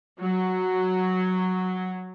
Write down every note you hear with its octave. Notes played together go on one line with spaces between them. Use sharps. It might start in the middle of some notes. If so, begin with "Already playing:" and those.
F#3